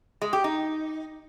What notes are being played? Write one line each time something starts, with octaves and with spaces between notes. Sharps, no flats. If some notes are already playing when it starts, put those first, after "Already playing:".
G#3
G4
D#4